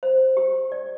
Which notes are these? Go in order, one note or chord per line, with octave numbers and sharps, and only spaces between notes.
C5
G4
D5